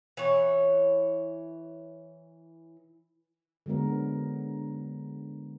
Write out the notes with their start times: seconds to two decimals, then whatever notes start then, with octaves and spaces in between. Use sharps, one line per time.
0.17 E3 C#5
3.66 D3 F#3 G#3 B3 A#4